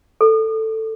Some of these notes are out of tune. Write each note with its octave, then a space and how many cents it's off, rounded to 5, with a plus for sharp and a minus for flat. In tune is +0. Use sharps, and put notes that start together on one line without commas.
A4 +10